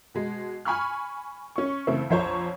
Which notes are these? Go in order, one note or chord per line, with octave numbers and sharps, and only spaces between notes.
B2 G#3
G#5 B5 C#6 F6
C#4 C#6
C#3 E3 A3 C4
A#1 F2 C5 C#5 A#5